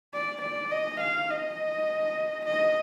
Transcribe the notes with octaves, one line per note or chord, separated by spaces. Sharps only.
D5
D5
D#5
F5
D#5
D#5